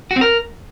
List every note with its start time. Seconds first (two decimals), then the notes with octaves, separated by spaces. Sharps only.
0.11 F#4
0.16 C4
0.21 A#4